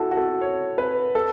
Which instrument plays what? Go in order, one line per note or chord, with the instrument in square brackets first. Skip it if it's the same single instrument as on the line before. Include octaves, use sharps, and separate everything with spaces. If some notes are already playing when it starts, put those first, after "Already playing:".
Already playing: [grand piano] E4 F#4 A4
F#4
A4
C#5
B4
A4